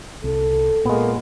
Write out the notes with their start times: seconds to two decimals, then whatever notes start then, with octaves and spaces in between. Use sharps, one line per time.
0.24 C2 A4
0.85 A#2 G#3 A#3 B3